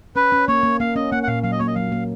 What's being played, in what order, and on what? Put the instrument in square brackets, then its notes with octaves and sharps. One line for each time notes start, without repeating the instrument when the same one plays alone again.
[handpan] C#4 [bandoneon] B4
[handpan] C#4
[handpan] A#3 [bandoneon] C#5
[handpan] A#3
[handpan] A#3 [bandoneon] F5
[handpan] C#4 [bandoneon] D#5
[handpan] A#3 [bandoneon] F#5
[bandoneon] F#5
[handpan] A#2 [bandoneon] F5
[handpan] F#3 [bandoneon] F5
[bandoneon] D#5
[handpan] A#3 [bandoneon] C#5
[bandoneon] D#5
[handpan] F#3 [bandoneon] F5
[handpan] A#3